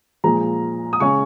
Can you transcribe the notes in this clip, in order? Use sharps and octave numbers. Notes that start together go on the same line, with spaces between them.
A#2 F3 G#3 A#5
D#6
C#3 G#3 C#4 C#6